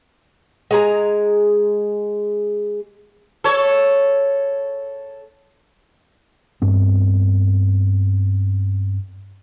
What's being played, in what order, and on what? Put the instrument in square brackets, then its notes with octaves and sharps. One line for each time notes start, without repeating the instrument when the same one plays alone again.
[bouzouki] G#3 G#4 A#5
[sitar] A4 C#5
[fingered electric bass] G2 B3 C4